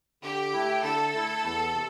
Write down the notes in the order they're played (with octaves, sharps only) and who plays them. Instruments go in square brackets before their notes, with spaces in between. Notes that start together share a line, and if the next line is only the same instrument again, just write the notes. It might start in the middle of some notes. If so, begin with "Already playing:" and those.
[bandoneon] D3 [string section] G4
[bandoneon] A3 E4
[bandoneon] D3 [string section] A4
[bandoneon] A3 E4
E2
C3